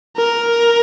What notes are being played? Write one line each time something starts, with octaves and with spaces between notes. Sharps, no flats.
A#4